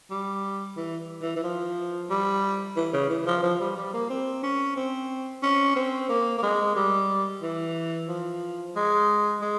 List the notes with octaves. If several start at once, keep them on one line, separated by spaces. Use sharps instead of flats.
G3
E3
E3
E3
F3
G3
E3
C#3
E3
F3
F3
G3
G3
A#3
C4
C#4
C4
C#4
C4
A#3
A#3
G#3
G3
E3
F3
G#3
G#3